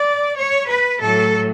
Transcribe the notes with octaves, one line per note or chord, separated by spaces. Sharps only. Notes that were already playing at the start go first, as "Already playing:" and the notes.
Already playing: D5
C#5
B4
A2 F#3 A4